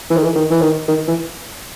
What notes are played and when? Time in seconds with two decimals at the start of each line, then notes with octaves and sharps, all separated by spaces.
0.10 E3
0.17 D#3
0.24 E3
0.36 D#3
0.50 E3
0.62 D#3
0.88 D#3
1.08 E3